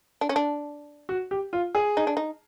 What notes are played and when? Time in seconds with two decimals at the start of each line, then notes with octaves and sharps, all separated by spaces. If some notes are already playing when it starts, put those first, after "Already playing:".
0.21 D4
0.29 C#4
0.36 D4
1.09 F#4
1.31 G4
1.53 F4
1.75 G#4
1.97 D#4
2.07 D4
2.17 D#4